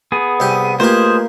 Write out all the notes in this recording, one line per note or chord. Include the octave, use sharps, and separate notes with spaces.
B3 G#4
C2 G4
A3 A#3 F4 G4 G#4 B4 C5